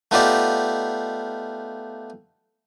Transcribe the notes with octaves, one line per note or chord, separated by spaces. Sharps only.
A3 B3 D#4 F4 G4 D5